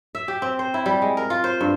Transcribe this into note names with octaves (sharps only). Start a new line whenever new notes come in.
E5
G4
C4
C5
E4
G3
G#3
A#4
F4
C5
G2